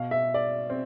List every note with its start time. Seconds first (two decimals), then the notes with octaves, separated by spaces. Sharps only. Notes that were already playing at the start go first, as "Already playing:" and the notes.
Already playing: B2 F5
0.11 E5
0.34 D5
0.70 C4